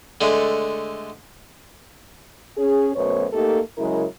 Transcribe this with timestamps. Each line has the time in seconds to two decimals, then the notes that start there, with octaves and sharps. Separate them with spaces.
0.21 D3 G#3 A3
2.57 C#4 G#4
2.95 F#2 B2 A3 B3 C5 C#5
3.32 A3 A#3 D#4 G4 A4
3.77 C#3 F#3 G#3 E4 A#4